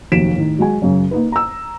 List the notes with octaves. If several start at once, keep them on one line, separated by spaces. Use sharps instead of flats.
F1 D#2 F#3 B6 D7 E7
A2 D#3
F#3 G#3 F#4 G#5
F#2 C#3
A#3 D#4 B4
A#5 E6